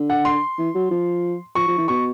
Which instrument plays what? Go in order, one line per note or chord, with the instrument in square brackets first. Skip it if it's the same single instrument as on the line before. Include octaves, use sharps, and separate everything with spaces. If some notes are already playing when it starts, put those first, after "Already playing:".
Already playing: [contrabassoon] D3
[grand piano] F#5
C6
[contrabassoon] E3
F#3
F3
[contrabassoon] F3 [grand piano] C#6
[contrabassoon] F3
E3
[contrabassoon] B2 [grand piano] C#6